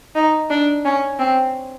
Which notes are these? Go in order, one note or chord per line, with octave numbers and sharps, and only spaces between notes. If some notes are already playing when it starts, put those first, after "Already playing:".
D#4
D4
C#4
C4